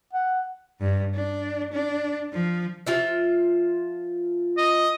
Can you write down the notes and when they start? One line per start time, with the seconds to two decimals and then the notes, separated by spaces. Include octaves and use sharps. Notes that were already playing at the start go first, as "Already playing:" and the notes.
0.13 F#5
0.80 G2
1.15 D4
1.73 D4
2.33 F3
2.87 F3 F4 E5
4.58 D#5